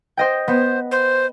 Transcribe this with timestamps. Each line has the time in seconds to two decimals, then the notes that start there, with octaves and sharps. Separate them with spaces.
0.17 C5 D#5 G5
0.48 B3 C5
0.91 C5